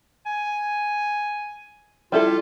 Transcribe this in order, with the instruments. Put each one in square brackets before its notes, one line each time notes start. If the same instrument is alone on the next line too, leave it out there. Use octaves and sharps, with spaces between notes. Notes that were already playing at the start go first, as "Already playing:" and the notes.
[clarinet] G#5
[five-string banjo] G3 E4 A4 [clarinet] F4